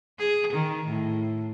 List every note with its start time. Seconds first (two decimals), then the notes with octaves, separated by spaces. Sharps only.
0.19 G#4
0.53 D#3
0.87 A2